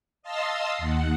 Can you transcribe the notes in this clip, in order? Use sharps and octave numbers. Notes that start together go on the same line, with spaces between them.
D#5 F5 A5 C6 D#6 E6
D#2 F#5